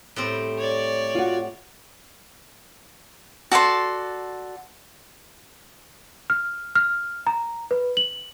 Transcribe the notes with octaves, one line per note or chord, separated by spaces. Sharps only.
A2 G3 C4
C#5 D5
F4 F#4
F#4 A4 D5 C6
F6
F6
A#5
B4
F#7